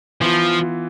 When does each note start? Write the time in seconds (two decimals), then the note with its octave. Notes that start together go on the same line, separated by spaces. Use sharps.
0.21 E3 F3 B3 F4